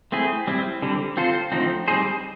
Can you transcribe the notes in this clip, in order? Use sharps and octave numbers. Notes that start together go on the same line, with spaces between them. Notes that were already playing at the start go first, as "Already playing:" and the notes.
A3 C4 E4 G#4
G3 C4 E4
D3 G3 C4
C4 F4 A4 C5
D3 F3 A3 C4 D#4
G3 C4 D#4 G#4 C5